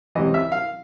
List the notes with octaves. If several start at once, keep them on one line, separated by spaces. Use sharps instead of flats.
C#2 C3 E3 D#5
E5
F5